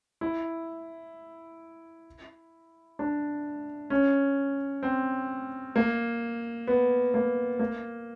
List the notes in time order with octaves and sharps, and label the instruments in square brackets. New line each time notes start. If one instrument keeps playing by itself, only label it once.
[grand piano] E4
D4
C#4
C4
A#3
B3
A#3
A#3